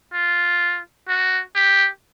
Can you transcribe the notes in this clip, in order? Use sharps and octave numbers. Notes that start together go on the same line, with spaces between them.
F4
F#4
G4